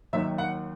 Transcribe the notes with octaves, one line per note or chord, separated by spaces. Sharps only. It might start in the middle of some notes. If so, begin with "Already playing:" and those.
D#2 D#3 F#3 E5
F#5